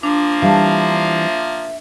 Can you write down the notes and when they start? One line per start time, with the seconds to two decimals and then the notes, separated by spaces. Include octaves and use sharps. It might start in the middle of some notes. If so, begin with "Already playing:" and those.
0.03 F3 A#3 D4
0.42 E3 G3 D4 E5 F5 A5